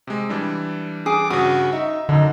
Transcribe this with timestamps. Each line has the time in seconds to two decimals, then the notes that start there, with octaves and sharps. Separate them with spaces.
0.07 C3 G#3
0.29 E3 G3 D4
1.06 G#4 D6
1.30 G2 C#3 F#4 D#6
1.73 D#4 E5
2.09 F#2 D3 D#4